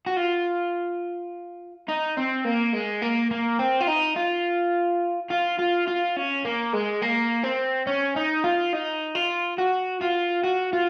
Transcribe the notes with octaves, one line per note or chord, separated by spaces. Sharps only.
F#4
F4
D#4
C4
A#3
G#3
A#3
A#3
C4
F4
D#4
F4
F4
F4
F4
C#4
A#3
G#3
A#3
C4
C#4
D#4
F4
D#4
F4
F#4
F4
F#4
F4